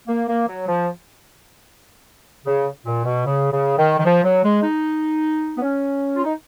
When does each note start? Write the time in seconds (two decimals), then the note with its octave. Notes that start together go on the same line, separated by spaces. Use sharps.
0.08 A#3
0.28 A#3
0.48 F#3
0.68 F3
2.45 C#3
2.85 A#2
3.05 B2
3.25 C#3
3.52 C#3
3.78 D#3
3.99 D#3
4.04 F3
4.24 F#3
4.44 G#3
4.63 D#4
5.57 B3
5.62 C#4
6.16 F4
6.25 D#4